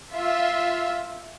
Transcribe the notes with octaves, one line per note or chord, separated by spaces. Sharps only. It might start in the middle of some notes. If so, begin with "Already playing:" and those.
F4 E5